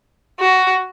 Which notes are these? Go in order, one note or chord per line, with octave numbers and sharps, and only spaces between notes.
F#4